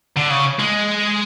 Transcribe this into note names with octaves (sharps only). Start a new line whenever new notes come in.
D3
C#3
G#3